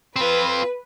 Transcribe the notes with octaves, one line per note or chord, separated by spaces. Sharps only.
C4 F4 B4